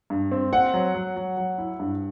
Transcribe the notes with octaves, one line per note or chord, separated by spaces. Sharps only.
G2
C4
C4 F#5
F#3
F#3
F#3
F#3
E4
G2